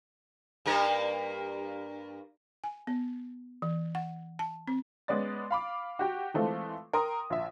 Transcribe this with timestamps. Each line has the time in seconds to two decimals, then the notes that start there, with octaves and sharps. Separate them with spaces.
0.66 G2 A#3 A#4
2.64 G#5
2.87 B3
3.62 E3
3.95 F#5
4.39 A5
4.68 C4
5.08 G#3 B3 C#4 D5 A6
5.51 F5 B5 D6
5.99 F#4 G4 G5
6.34 E3 G#3 A3 C4 F4 A4
6.93 A#4 G5 C6 D#6
7.30 A#1 E5